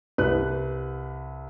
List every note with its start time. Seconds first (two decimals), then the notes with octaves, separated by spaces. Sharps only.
0.18 C2 B4 F#6